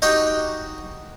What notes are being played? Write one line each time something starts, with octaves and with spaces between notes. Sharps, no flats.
D#4 F#4 G4 D#5 G5